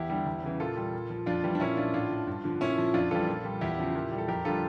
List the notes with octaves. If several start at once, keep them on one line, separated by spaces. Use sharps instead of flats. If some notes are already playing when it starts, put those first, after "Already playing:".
Already playing: E2 E4 G4
D3 G3
E2
C#3 E3
A#2 F4 A4
G3
A#2
F3
F2 D4 F4
E3 G3
D4
A#2 C#4 E4
F3 D4 F4
A2 D4 F4
F3
G2
D3 F3
A#2 C#4 E4
F3
F2 D4 F4
E3 G3 F4 A4
A#2
G3
E2 E4 G4
C#3 F3
A#2
G3
A4
F2 G4 A#4
D3 G3 F4 A4